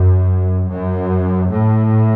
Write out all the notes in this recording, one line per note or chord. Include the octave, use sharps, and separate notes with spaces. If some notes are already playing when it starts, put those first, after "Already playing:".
Already playing: F#2
F#2
A2